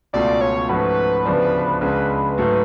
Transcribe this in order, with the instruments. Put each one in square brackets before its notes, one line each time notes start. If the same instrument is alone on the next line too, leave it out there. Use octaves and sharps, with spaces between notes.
[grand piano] C#2 B2 A3 F4 [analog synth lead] D5
[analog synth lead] C#5
[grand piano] G#2 F3 A3 C#4 F#4 [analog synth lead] B4
[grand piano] D2 C#3 F3 B3 D4
[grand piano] C#2 C#3 G#3 D4 [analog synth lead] B4
[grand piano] G#2 F#3 A3